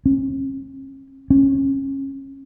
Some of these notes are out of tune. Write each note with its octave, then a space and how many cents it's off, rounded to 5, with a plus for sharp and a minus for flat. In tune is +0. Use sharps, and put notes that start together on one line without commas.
C#4 -40
C#4 -25